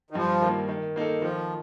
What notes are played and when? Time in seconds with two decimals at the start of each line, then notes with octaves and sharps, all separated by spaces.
0.10 D#3
0.15 G2 F3
0.42 D#3 A#3
0.69 D#3
0.96 A#3 D#4 A4
1.22 D#3 F3